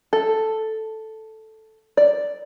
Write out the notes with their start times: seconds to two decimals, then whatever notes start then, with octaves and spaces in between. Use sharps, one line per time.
0.13 A4
1.97 D5